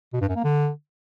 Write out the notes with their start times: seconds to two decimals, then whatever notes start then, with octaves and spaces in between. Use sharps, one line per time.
0.13 B2
0.21 G2
0.29 F#2
0.36 A#3
0.44 D3